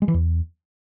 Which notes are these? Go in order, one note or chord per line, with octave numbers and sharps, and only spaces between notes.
G#3
E3
E2